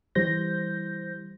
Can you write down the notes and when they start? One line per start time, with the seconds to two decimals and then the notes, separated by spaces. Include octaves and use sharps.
0.15 E3 G3 C5 G6 A#6